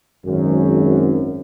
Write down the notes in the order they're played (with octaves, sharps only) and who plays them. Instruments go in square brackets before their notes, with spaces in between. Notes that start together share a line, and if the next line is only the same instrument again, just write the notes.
[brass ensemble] G#1 F#2